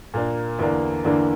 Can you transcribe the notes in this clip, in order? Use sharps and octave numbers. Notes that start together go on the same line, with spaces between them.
A#2 A#3 D4
E2 D3 A#3 D4
E2 D3 A#3 D4